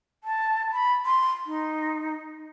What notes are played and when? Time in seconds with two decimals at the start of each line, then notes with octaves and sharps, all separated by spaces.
0.24 A5
0.72 B5
1.06 C6
1.47 D#4